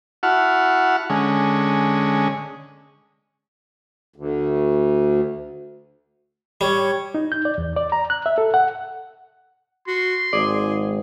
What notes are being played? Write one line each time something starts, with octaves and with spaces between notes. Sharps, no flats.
E4 F#4 F#5 A5 F6
D3 G#3 C#4
D2
G3 C#5
D#4
G6
D5
E2
D5
A#5
F#6
E5
A4
F#5
F#4 C6
G#1 G#4 D5